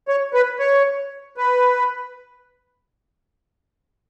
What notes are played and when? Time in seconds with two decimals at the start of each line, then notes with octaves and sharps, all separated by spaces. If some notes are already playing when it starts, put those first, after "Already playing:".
0.08 C#5
0.34 B4
0.59 C#5
1.37 B4